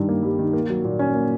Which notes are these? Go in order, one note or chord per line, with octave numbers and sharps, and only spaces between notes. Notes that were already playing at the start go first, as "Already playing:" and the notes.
Already playing: G2 D#3 G3
A#3
G3
D#3
A#3
F#3
A#2
C#4
A#3